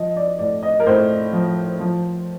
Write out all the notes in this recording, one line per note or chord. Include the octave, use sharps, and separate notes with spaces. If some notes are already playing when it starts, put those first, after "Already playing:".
Already playing: F3 D#5
D5
A2 D5
D#5
A#4
A2 C5
F3
F3